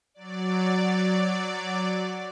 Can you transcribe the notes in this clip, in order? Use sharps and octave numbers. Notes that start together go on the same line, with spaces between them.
F#3 D5